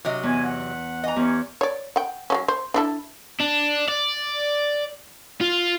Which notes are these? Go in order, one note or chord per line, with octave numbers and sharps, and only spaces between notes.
C3 F#3 D#5
E2 G#5
F#5
E3 D#5 A#5
E2 C#4 G4 C#5
C#5 D5
F#5 G5
F#3 A3 C#4
C5
D4 E4 A4
D4
D5
F4